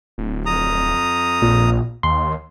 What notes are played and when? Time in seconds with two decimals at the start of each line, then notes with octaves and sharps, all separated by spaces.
0.18 D1
0.46 F2 A#5 D#6
1.42 A#1 A#2
2.03 D#2 C6